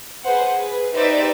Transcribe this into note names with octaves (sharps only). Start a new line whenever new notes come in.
G#4 B4 C5 F#5
G#4 B4
D#4 G4 B4 C5 D5 E5